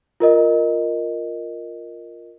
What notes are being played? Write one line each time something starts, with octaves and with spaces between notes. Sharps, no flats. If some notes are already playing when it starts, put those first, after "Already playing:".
F4 A#4 D#5